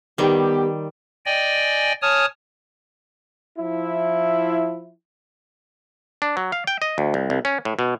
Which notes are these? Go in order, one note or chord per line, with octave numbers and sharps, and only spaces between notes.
D#3 G3 B3 G4
D5 D#5 G5 G#5
C#5 G#5 A5 D#6 F6
F3 E4
D4
F#3
F5
G5
D#5
D2
C2
C2
C#4
A2
B2